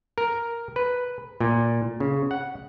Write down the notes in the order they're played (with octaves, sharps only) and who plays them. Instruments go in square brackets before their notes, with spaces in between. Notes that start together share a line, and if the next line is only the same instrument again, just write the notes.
[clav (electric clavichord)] A#4
B4
A#2
C#3
F#5